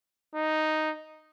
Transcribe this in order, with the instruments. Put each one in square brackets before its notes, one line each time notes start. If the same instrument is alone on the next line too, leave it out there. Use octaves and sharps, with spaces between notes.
[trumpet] D#4